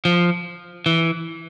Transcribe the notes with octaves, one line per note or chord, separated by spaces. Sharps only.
F3
E3